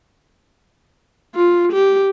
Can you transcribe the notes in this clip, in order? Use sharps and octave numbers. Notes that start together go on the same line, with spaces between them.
F4
G4